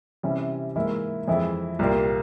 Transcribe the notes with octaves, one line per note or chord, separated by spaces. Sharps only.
C3 E3 G3 C#4
G#2 E3 A#3 E4
F2 E3 G#3 E4
C2 A#2 G3 A#3